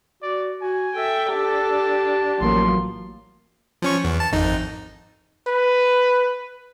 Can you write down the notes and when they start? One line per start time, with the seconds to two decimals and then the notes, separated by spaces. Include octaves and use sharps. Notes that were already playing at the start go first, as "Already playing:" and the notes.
0.23 F#4 D5
0.62 F#4 G#5
0.95 A4 E5 G5
1.30 D4 G4 A5
2.41 A1 F3 F#3 A#3 C6
3.82 F3 C#4 C#6
4.04 E2
4.20 A5
4.32 G#1 F2 D#4
5.47 B4